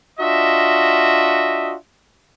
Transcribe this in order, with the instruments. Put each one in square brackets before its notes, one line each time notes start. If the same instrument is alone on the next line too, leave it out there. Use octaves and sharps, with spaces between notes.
[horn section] D4 F4 F#4 D#5 E5